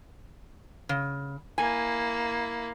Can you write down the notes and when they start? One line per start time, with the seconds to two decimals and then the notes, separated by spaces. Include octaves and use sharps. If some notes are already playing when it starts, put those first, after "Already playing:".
0.89 C#3
1.58 A#3 E4 G#5